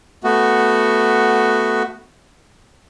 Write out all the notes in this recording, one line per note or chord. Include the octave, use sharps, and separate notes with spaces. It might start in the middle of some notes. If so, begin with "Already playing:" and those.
A3 B3 F#4